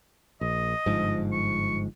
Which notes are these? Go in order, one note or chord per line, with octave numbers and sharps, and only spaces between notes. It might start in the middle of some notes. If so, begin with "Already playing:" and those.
A#1 D#5
G1 G#2 F3
C#6